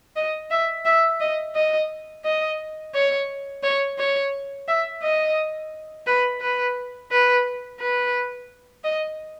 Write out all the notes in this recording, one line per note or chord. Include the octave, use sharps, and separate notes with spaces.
D#5
E5
E5
D#5
D#5
D#5
C#5
C#5
C#5
E5
D#5
B4
B4
B4
B4
D#5